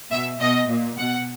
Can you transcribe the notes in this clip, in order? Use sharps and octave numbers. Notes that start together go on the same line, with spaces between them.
B2 E5
B2 D#5
A#2
B2 F#5